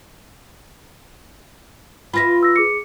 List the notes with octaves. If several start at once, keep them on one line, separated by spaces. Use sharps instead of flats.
F4 B4 E5 B5 A#6
E6 A#6
G#4 D6 C#7